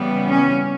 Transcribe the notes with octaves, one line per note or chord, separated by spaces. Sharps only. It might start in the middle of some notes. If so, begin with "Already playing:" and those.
Already playing: C#3 E3 G3 B3
C#4